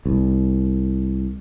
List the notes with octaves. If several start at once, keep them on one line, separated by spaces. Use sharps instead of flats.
C2